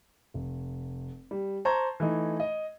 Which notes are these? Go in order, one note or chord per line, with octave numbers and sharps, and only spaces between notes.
F1
G3
C5 A5 A#5 C#6 G#6
E3 A3 D#4
D#5